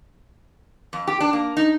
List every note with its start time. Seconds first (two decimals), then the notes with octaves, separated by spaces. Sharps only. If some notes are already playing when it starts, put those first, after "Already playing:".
0.93 F2
1.07 G4
1.20 D4
1.33 A#3
1.57 D#4